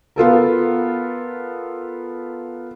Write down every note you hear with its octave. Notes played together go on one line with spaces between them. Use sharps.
B3 F4 A4 A#4